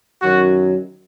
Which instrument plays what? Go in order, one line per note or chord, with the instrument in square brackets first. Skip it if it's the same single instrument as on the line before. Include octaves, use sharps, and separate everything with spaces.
[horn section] F#2 D#3 F#3 F#4